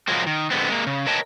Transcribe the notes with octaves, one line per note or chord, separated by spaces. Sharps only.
F3 F#3 G#3 A#3 C4
D#3
D3 G#3 B3 C4
G#3 A#3
C#3
A#4 B4 C#5 D#5 G5 A5